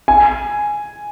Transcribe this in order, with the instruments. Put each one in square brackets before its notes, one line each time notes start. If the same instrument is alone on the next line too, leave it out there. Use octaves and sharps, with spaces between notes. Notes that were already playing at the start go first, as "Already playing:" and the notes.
[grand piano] G#5